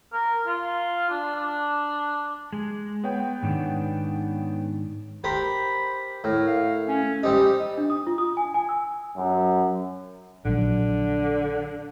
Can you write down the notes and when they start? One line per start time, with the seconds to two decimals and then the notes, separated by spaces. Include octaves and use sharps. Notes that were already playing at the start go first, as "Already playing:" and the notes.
0.13 A#4
0.46 F4
1.10 D4
1.36 D4
2.53 G#3
3.04 B3 C#5 G5
3.43 G#2 D#3 D4
5.24 G4 A#4 C5 B5
6.24 A2 A#4
6.47 F5
6.88 C#4
7.23 G3 C4 D#4 G4
7.78 D4
7.90 D#6
8.07 F4
8.18 D#6
8.37 G#5
8.54 G#5
8.69 E6
9.17 F#2
10.45 A#1 D3 F#3